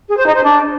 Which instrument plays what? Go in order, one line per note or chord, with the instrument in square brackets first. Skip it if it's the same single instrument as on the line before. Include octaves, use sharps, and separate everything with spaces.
[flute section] G#4
C5
D#4
C5
D4